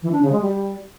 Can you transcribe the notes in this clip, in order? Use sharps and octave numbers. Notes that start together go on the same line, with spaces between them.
E3
D4
C#3
G#3
G3